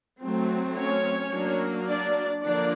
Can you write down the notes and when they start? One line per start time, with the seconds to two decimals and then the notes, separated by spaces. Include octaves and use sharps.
0.21 F#3 A3 C4
0.77 C#4 C#5
1.32 F#3 A#3 D4
1.87 D4 D5
2.42 D3 F3 A#3 D4 D5